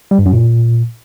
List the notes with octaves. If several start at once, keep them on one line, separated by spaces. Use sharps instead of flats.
G3
G2
F#2
A#2